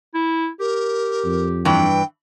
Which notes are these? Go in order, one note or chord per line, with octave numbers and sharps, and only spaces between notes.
E4
G4 A#4
F2
G2 E3 G5